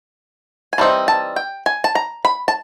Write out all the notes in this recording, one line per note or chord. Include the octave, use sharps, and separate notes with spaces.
G#5
E3 G3 C4 D#4 A5
A5
G5
G#5
A5
A#5
B5
A5